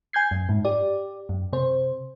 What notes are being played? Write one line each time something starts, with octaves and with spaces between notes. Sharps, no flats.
G#5 G6 G#6 C7
F#2
G#2
G4 D5
F#2
C3 C5